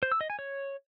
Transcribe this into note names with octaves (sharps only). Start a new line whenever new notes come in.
C5
E6
D#5
G#5
C#5